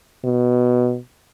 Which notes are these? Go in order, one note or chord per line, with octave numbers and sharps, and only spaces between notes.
B2